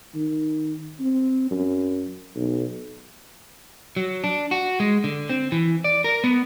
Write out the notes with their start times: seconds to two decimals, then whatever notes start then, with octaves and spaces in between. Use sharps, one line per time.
0.14 D#3
1.00 C4
1.51 F#2
2.36 B1
3.96 F#3
4.24 D4
4.51 F#4
4.80 G#3
5.04 D3
5.29 C4
5.52 E3
5.84 D5
6.04 A#4
6.24 B3